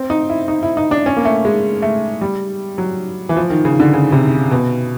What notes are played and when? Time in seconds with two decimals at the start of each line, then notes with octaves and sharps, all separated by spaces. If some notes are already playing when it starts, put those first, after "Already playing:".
Already playing: C4
0.10 D#4
0.30 E4
0.48 D#4
0.63 E4
0.77 D#4
0.91 D4
1.06 C#4
1.17 A#3
1.25 A3
1.45 G#3
1.82 A3
2.21 G3
2.78 F#3
3.29 E3
3.37 F3
3.50 D#3
3.65 C#3
3.80 D3
3.94 C#3
4.12 C3
4.51 B2